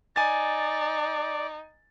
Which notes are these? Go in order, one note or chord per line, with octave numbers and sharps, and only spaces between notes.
D#4 D5 G#5 A6